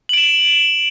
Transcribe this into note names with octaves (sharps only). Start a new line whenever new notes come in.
D7 E7 F#7